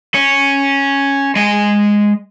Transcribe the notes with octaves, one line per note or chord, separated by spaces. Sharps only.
C#4
G#3 G#5